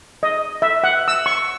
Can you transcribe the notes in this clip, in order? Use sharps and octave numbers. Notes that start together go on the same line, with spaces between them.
D#5
E5
F#5
E6
C#6